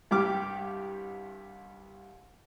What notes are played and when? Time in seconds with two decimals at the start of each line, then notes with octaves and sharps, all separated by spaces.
0.11 C2 G2 G4 D6 F6